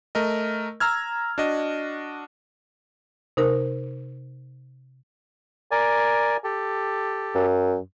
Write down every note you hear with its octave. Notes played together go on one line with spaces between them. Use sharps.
A3 A#4 D#5
A#5 E6 F6 G#6
D4 F#4 D#5
C3 D#4 A#4
A#4 D5 G#5
G4 A4
F#2